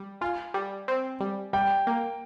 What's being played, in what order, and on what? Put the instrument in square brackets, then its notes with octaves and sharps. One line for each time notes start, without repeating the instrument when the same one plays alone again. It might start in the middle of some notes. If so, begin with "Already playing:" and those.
Already playing: [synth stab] G3
[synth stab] F4 [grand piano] G#5
[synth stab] G3
C4
G3
[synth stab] G3 [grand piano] G5
[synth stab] A#3